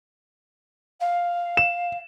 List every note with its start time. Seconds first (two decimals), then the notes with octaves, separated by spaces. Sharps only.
1.00 F5
1.57 E7